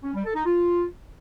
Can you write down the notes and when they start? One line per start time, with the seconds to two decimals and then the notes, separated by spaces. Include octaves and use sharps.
0.04 C#4
0.14 G3
0.25 A4
0.35 D#4
0.46 F4